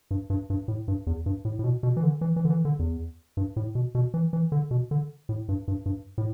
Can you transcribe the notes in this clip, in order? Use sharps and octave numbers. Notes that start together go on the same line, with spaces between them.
G2
G2
G2
A2
G2
E2
G2
A2
A2
B2
B2
E3
D3
E3
E3
D3
E3
D3
E2
G2
A2
B2
B2
E3
E3
D3
B2
D3
A2
G2
G2
G2
A2